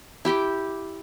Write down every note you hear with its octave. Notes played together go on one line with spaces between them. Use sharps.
E4 G4 G5 D6